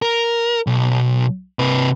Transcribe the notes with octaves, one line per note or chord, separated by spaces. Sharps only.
A#4
B1
C3 B4